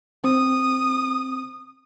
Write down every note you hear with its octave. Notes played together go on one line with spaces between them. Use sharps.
C4 D#6